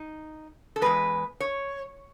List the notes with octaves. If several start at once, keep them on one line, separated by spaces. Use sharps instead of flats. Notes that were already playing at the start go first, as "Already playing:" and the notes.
Already playing: D#4
A4
E2 B2 G#3 B4
C#5